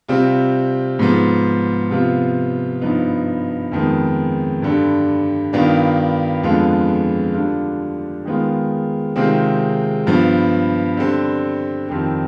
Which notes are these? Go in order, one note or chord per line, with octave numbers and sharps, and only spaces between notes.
C3 G3 C4 F4
G#2 F3 B3
C3 F3 B3 F4
G2 F3 B3 D#4
F2 D#3 G#3 B3
G2 D3 G3
G2 D#3 B3 D4 F4
F2 D3 G#3 B3 F4
D3 G3 D4 F4
D#3 G#3 B3 F4
C3 D#3 G#3 C4 F4
G2 F3 B3
D3 G3 C4
F2 D#3 G3 C4